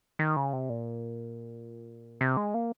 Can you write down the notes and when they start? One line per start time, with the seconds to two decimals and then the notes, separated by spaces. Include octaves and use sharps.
0.19 D#3
0.36 C#3
0.53 C3
0.70 A#2
2.21 C3
2.37 G#3
2.54 A#3